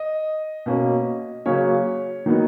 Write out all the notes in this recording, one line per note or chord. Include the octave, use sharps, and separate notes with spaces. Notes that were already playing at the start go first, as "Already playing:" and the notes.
Already playing: D#5
B2 A#3 C#4
C#3 F#3 A#3 C#4 C#5
D#3 F#3 B3 D#4